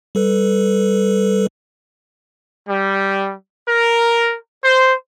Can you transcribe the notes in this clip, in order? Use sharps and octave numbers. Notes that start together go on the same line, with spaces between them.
G3 A4 B4
G3
A#4
C5